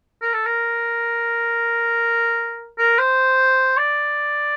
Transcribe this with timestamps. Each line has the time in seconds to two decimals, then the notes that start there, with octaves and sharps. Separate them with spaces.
0.22 A#4
0.34 A4
0.46 A#4
2.78 A#4
2.98 C5
3.78 D5